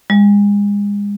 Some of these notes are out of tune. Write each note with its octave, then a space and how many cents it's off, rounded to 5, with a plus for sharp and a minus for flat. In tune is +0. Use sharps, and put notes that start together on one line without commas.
G#3 -35